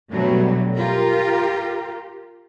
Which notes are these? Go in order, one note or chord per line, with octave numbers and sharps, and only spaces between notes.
B2 D3 F#3 G3 A3
F4 G4 A#4